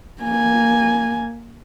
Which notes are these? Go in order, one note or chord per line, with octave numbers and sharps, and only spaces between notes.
A#3 G#5